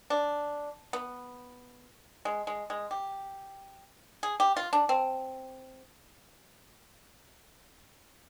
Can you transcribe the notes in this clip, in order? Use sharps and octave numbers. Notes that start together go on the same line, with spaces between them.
D4
B3
G#3
G#3
G#3
G4
G#4
G4
F4
D4
C4